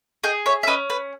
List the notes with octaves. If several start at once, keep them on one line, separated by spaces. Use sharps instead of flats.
G#4 D#5 G5
C#5 E5
E5
C#4 B4 D#5
B4